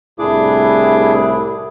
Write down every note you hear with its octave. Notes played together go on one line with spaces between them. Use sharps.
C2 A2 D4 E4 G#4 D6